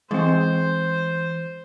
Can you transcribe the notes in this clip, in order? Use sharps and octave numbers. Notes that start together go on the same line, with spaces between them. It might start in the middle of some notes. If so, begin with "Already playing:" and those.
E3 G#3 C4 C5